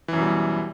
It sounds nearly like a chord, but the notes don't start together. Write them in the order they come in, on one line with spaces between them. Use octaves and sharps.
E3 F#2 B2 G3